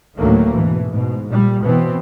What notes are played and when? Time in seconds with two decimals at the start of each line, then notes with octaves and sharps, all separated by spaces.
0.18 D2 A2 D#3 F#3 A3 A#3
0.54 G#2 B2 E3
0.90 G#2 B2
1.31 A#2 G3
1.64 B2 E3 B3 C4